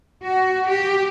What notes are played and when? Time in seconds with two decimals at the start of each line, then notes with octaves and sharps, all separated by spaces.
0.23 F#4
0.68 G4